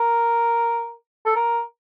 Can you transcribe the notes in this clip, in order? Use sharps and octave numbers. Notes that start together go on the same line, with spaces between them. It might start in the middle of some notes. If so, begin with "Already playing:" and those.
Already playing: A#4
A4
A#4